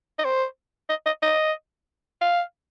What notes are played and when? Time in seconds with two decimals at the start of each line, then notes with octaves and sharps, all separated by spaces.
0.19 D#5
0.24 C5
0.89 D#5
1.06 D#5
1.23 D#5
2.21 F5